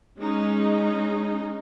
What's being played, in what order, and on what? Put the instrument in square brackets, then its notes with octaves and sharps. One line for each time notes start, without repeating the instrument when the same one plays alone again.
[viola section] G#3 C#4 D#4